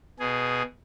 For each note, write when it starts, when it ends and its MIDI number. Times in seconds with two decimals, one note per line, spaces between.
0.19 0.62 47
0.19 0.62 68